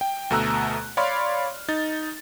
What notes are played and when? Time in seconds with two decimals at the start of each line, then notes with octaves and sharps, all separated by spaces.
0.01 G5
0.30 D2 B2 A3 A#5 E6 F#6
0.97 C#5 D5 F5 B5 C6 F6
1.68 D#4 A6